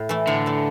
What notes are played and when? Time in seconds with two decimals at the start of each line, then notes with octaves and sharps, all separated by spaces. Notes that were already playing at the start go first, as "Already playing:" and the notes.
Already playing: A2
0.09 E3 A3
0.27 A2 D3
0.46 E3 A3